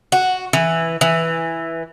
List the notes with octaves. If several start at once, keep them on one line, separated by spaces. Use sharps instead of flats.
F#4
E3
E3